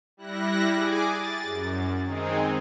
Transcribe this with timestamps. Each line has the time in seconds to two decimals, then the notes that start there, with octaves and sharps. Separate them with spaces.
0.17 G3 E4 F#6 A#6
0.72 G#4 G#5 D6
1.04 A6
1.42 F#2
2.03 D#3 G#3 C4 D#4 G#4